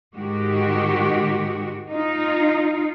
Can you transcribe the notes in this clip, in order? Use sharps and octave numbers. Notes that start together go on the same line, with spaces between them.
G#2 D#3 G#3 F#4 G4
D#4 F4